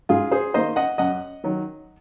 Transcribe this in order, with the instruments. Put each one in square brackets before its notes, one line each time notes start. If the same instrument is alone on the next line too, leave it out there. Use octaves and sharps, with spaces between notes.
[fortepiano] G#2 F4 G#4
G#4 C5
D#3 A#3 C5 D#5
D#5 F#5
F#2 D#5 F#5
D#3 F#3